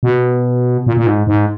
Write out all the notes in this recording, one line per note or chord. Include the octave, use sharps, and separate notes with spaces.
B2
A#2
A#2
G#2
G#2